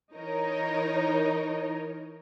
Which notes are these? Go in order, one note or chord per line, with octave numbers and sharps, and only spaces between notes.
E3 D#4 A#4 C#5 D#5